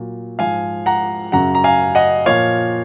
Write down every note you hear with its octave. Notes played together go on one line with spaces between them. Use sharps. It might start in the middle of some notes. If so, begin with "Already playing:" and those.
Already playing: A#2 F#3
G#2 F3 F5 G#5
F#5 A#5
F#2 C#3 F#3 F#5 A#5
A#5
F5 G#5
D#5 F#5
A#2 F3 C#5 F5